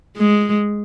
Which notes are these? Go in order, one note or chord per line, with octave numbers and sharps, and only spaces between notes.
G#3